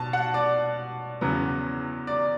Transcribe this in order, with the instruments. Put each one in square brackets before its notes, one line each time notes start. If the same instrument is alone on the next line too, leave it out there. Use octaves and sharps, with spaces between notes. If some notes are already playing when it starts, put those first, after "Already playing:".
Already playing: [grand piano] B2 A5
F#5
D5
E2 C#3 F#3 B3
D5